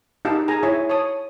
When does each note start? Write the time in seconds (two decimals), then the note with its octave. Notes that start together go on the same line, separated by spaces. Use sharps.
0.25 D#4 G4 F5 A5 E6
0.48 G#4 G#5 A#5
0.63 E4 C#5 E5 G#5
0.89 C#5 A5 C#6 D#6